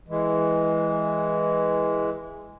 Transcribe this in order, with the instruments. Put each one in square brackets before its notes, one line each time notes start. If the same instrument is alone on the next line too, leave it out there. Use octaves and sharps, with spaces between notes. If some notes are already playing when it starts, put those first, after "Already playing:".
[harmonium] E3 G#3